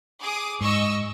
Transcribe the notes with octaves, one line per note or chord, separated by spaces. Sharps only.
G#4 D6 D#6
G#2 D#5 C#6 E6